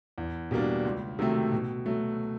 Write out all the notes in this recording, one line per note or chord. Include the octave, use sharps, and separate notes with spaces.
E2
B2 G3 A#3 D4
C#2
C3 D#3 F#3 A3
B2
F#3 A3